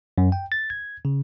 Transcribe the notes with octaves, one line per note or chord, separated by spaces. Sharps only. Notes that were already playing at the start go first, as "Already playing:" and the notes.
F#2
G5
A6
G#6
C#3